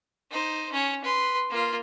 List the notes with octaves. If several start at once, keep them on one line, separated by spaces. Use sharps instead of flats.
D#4 C5
C#4 C#5
B4 C6
A#3 F4